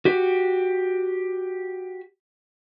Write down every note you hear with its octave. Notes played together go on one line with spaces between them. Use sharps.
F#4 G4